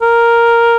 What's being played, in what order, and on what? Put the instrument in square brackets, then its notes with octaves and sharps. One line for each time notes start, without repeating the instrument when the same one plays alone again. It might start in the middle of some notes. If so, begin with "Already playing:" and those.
[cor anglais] A#4